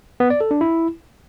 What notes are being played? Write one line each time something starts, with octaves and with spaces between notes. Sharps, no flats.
B3
D5
A4
D4
E4